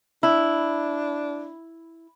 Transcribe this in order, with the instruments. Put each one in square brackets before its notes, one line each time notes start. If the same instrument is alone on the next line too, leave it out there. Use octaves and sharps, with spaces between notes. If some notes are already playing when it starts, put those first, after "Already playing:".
[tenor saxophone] D4 [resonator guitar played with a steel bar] E4